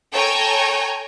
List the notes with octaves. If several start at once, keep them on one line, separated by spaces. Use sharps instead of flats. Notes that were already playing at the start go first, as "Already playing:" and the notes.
A4 C#5 G5 G#5 A#5